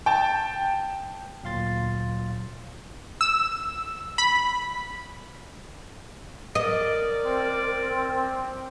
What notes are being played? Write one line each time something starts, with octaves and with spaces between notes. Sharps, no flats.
G5 A5
D2 A#2 F#3 F5 C6 A6
E6
B5
A#4 D5 D#5
C4